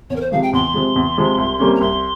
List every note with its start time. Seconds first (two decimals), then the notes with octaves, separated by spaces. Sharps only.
0.10 E2 C#5
0.16 A#4
0.21 C5
0.32 C3 F3 G#3 F5
0.43 G5
0.53 E2 C6
0.74 C3 F3 G#3
0.96 E2
1.18 C3 F3 G#3
1.38 C2
1.59 C3 G3 A#3 C#4
1.75 A#5
1.81 C2 C6